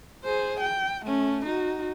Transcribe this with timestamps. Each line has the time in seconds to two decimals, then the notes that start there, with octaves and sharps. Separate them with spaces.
0.25 G#4 C5
0.60 G5
1.06 A3 C#4
1.46 D#4 F#4